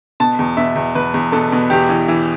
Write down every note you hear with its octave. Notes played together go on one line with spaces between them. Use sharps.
B2 A5
E2
B2 E5
E2
E2 B4
E2
B2 A4
B2
E2 G4
E3
E3